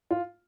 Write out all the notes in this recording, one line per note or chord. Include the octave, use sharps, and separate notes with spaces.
F4